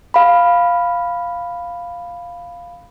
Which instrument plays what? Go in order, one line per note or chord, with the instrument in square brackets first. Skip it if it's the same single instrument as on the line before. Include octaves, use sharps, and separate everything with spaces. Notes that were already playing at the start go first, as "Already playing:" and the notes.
[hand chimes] F5 B5